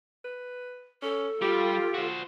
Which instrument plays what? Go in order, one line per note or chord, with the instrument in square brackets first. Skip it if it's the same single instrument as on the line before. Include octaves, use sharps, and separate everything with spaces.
[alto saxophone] B4
[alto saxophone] C#4 [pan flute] A4
[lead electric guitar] G3 [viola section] F4 [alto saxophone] G4
[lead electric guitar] F#4 C5